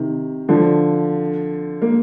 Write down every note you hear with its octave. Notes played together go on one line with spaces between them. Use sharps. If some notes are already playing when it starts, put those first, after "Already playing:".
Already playing: C3 D#3
D3 F3
A#3